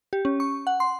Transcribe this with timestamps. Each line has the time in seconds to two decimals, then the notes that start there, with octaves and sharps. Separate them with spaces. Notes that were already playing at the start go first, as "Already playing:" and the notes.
0.13 G4
0.25 C#4
0.40 C#6
0.67 F#5
0.80 C6